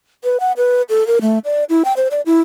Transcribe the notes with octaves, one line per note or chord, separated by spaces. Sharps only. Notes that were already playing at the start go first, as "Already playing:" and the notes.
B4
F#5
B4
A4
A#4
A3
D5
E4
G5
C5
D5
E4